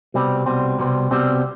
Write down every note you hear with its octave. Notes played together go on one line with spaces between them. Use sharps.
C2 B2 G3 C4
C2 B2 G3 C4
C2 B2 G3 C4
C2 B2 G3 C4